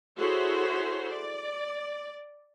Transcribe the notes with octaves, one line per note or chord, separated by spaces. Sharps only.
E4 F#4 G#4 A4 C5 C#5
D5